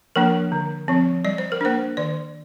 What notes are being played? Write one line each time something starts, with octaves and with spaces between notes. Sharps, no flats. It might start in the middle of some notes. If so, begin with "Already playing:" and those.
F3 A#3 D4 A#4
D3
F3 C4
G3 D5
C5
A#4
A#3 D4 C5
D#3 D5